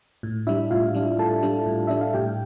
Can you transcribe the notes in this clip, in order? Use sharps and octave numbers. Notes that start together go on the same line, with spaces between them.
A2
G3 D4 E4 E5
A2 F4 F5
G3 D4
A2 A4 A5
G3 D4
A2
G3 D4 E5
F5
A2 G4 G5